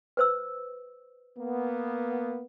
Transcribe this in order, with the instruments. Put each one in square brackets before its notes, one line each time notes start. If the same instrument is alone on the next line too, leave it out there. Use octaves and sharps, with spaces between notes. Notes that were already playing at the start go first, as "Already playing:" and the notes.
[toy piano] B4 C5 E6
[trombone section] A#3 B3